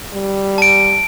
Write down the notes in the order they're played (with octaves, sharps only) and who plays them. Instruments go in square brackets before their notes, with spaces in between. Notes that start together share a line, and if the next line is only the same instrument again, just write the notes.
[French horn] G3
[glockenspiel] A5 D7